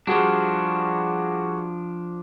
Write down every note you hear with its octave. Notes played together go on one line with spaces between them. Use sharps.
F3 G3 D4 F#4 G#4